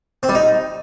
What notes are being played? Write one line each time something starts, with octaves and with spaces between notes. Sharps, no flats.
C4
G3
D#4